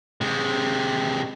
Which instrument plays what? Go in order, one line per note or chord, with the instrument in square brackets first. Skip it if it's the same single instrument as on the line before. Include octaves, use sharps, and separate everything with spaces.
[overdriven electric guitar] C3 G#3